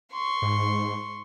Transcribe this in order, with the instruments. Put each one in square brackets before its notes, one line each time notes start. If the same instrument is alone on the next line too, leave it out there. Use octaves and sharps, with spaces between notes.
[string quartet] C6 C#6
[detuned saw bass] G#2